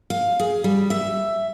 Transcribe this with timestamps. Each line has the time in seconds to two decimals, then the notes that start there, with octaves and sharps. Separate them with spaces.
0.10 F5
0.40 G#4
0.64 G3
0.90 E5